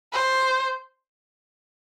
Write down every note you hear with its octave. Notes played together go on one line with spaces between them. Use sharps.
C5